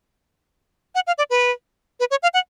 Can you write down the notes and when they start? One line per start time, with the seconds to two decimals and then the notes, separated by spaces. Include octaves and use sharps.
0.95 F#5
1.07 F5
1.18 D5
1.30 B4
2.00 B4
2.11 C#5
2.23 F5
2.34 F#5